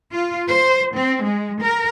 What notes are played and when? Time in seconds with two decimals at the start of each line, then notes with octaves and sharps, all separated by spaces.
0.11 F4
0.48 C5
0.94 C4
1.23 G#3
1.59 A#4